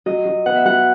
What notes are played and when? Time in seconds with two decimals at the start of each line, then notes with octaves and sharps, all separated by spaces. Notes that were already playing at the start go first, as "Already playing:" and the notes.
0.06 F#3 D#5
0.26 F#3
0.46 B3 F#5
0.56 E5
0.66 F#3 F#5